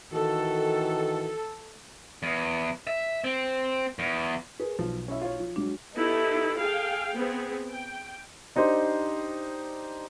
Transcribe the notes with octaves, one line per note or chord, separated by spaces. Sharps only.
D#3 E3 F#4 A4
E2
E5
C4
E2
G#4 A#4 B4
B1 F3
C#4 E4 E5
F4 C#5
F3
F#3 G#3 D4 F#4
B3 D#4 E4 G4 A4
G#4 A4 F5 G5
B3 C4 G#4
G5
D4 D#4 G4 C5